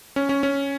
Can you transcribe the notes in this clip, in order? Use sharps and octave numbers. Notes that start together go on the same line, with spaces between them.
C#4
C#4
C#4